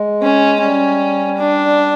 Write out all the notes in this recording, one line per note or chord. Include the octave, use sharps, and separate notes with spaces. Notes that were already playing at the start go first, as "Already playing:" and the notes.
Already playing: G#3
C#4
G3 C#4
D4